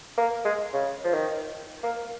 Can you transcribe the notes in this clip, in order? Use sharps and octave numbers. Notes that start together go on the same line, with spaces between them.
A#3
G#3
C#3
F3
D#3
A#3